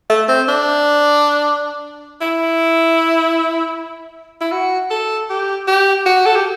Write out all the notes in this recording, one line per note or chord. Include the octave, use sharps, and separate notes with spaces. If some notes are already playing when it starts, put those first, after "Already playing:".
A3
C4
D4
E4
E4
F#4
A4
G4
G4
F#4
A4
G4